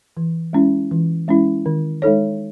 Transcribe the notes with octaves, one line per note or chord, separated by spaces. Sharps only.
E3
G#3 C#4 E4
E3
G#3 C#4 E4
D#3
G#3 D#4 A4 C#5